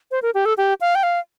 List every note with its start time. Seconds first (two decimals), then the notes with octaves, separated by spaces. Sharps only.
0.11 C5
0.22 A#4
0.34 G4
0.45 A4
0.57 G4
0.81 F5
0.95 G5
1.03 F5